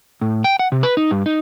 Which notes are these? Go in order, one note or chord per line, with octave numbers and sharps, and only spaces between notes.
A2
G5
F#5
C3
B4
D#4
G2
D#4